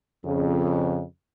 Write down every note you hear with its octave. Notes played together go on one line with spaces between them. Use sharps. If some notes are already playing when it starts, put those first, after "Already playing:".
F2 C#3